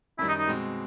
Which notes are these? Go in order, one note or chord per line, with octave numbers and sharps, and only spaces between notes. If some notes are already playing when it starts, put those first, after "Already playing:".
F#2 D#3 G3 E4
D#4
D#4
B2 G#3 C4